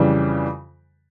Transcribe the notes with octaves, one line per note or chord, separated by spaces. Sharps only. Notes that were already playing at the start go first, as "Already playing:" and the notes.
Already playing: F2 C#3 E3 G3